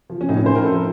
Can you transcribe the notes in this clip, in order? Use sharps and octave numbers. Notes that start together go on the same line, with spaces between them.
F3
C#4
A2 D#4
C#4
F3 C5
A#4
F3 A4